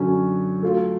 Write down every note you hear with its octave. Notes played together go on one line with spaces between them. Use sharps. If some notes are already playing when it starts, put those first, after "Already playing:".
Already playing: F#2 D3 F#3 C#4
F#3 A3 F4